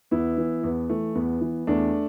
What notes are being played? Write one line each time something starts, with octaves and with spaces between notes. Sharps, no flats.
E2 B3 E4
E3
E2 B3
E3 A3
E2 B3
E3
E2 A3 D4